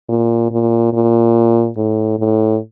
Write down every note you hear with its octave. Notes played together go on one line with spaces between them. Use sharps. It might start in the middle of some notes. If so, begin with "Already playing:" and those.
A#2
A#2
A#2
A2
A2